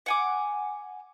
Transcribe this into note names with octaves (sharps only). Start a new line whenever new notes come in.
F#5 G#5 D6